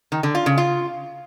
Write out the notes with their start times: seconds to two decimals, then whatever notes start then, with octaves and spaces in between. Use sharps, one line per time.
0.12 D#3
0.23 D3
0.35 F4
0.46 C#3
0.58 F4